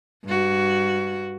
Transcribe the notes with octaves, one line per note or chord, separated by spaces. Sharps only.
G2 F#4